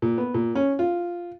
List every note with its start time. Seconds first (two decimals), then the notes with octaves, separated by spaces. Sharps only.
0.02 A#2
0.18 B3
0.34 A#2
0.55 C#4
0.79 F4